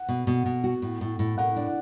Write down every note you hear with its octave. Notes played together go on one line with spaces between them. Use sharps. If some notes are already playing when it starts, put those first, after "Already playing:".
Already playing: F#5
B2
B2
B2
F#4
A2
A2
A2
A2 F#5
D4